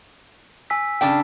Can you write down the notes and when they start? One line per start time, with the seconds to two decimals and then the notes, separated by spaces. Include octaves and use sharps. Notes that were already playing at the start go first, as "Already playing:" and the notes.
0.70 G#5 E6 B6
1.01 C#3 D4 G5